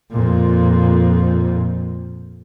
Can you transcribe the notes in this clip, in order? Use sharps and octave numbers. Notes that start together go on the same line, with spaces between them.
F2 A#2